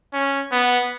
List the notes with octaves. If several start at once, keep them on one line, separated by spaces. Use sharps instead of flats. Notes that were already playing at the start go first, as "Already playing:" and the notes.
C#4
B3